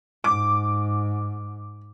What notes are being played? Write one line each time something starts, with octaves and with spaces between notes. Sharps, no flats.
G#2 D6